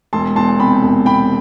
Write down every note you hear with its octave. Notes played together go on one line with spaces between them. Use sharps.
E1 A5 C6
E2 A5 C6
C3 G5 B5
E1
E1 G5 B5